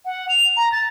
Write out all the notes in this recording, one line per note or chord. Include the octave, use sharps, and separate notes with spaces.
F#5
F7
A#5
A6